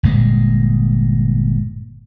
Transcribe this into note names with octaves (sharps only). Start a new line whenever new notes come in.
G1 A#2 G#3